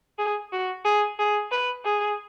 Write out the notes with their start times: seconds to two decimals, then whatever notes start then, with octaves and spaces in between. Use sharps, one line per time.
0.18 G#4
0.52 F#4
0.85 G#4
1.19 G#4
1.51 B4
1.85 G#4